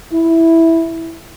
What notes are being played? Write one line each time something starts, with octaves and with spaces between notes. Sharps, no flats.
E4